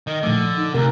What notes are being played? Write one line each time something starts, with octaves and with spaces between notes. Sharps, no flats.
D#3 D#5
A#2 D3 F3 A3
D#4
D2 C3 A#4